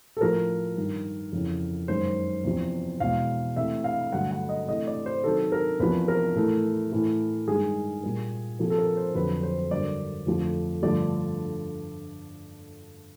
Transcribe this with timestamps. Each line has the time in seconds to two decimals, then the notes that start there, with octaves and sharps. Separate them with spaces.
0.17 A4
0.21 A2 F3 A#3 A#4
0.77 G2 D#3 G3
1.33 F2 C#3 E3
1.88 F#2 D#3 G#3 C5
2.44 E2 C3 F3
3.00 E2 B2 G#3 F5
3.56 C3 E3 A3 E5
3.84 F5
4.12 G2 D3 F#3 A3 F#5
4.31 F#5
4.49 D#5
4.68 C3 E3 A3 D#5
4.87 D5
5.06 C5
5.24 C3 D#3 F#3 A4
5.52 A#4
5.80 E2 C3 F3 A#3 B4
6.08 A#4
6.35 A2 E3 A3
6.92 A2 E3 A3
7.48 G2 D#3 G#3 G#4
8.03 A#2 G3 A#3
8.59 C3 F3 A#3 A4
8.70 A4
8.78 A#4
8.97 C5
9.15 F2 D3 F#3 B4
9.43 C5
9.71 G2 D3 F#3 A#3 D5
10.27 F2 D3 F3 A3
10.83 G2 D3 F3 A3 D5